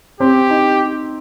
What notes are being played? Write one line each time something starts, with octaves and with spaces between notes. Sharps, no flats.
C4 G4
D#4